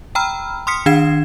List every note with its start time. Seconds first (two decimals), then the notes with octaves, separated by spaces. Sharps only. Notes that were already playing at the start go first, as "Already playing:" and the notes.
0.15 G5 A#5 B5 E6 F6
0.67 C6 D#6 F6 B6 C#7
0.86 D#3 D4 F5 G#6 C7 E7